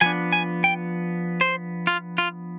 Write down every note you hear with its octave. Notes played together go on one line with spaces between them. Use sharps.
F3 B3 D4 G#5
G#5
G5
C5
F4
F4